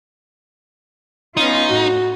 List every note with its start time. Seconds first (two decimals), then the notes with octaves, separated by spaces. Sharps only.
1.37 B3 C#4 D#4 F4
1.69 A2 F#4